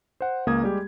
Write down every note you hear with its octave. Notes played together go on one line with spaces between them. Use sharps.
C5 F#5
C#2 A#3 D#6 G#6
G3 G#3 G4